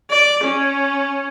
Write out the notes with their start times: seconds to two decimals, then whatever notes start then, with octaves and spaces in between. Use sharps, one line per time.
0.10 D5
0.44 C#4